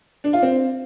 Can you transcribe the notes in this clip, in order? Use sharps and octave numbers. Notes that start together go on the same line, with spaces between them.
D4
F4
C4